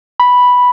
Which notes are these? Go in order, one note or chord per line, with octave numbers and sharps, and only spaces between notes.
B5